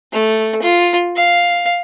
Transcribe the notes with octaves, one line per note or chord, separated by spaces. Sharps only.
A3
F4
F5